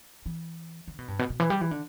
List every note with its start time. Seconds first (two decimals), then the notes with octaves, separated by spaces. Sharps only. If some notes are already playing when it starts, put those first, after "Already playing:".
0.26 E3
0.87 D3
0.99 B2
1.08 G2
1.19 B2
1.30 B2
1.40 E3
1.50 G3
1.61 E3
1.71 D3